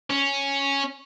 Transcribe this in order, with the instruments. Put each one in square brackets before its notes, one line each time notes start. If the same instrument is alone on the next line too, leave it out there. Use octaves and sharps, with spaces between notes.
[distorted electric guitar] C#4